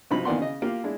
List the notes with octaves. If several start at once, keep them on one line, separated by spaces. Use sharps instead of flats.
G2 C3 F3 F#3 D#4 B5
D#3 E3 A#3 D5 F#5 C6
C#3 D#5
A#3 F4 G4
G#3 D4 E4